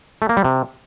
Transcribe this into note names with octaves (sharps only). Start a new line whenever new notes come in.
A3
A#3
G3
C3